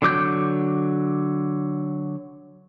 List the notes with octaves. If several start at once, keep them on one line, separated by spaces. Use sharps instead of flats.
D3 F#3 D6 G6